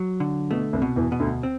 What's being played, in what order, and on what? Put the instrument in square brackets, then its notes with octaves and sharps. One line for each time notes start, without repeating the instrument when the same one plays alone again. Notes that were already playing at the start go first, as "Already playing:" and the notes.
Already playing: [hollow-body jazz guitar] F#3
D3
[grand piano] B2 [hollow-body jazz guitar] A3
[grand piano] C2 C3
[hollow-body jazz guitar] B2
[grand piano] E2 E3
[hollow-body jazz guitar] B2
[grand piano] D2 D3
[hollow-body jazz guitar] C4